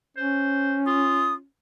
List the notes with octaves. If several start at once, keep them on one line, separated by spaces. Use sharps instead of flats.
C#4 C5
F4 D#6